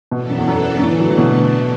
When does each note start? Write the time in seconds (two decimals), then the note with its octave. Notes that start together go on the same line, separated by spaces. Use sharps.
0.11 B2 E3 B3 D4 A4
0.29 F#2
0.38 E2
0.48 F#2
0.78 F#2
0.82 A2 D3 A3 D4
0.92 E3
1.00 F#3
1.10 E3
1.18 B2